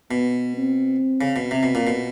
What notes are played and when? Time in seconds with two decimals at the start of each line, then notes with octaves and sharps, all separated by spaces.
0.11 B2 B3
0.57 C4
1.21 C#3
1.36 B2
1.51 C3 C4
1.63 B2
1.75 A#2
1.87 B2